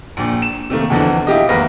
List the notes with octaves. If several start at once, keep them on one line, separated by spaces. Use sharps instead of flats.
A#1 A#2
E7
C3 D#3 A3 A#3
E2 B2 D3 E3 F3
E4 F4 G4 D#5
G#1 E2 A#3 A#4 B4 A#6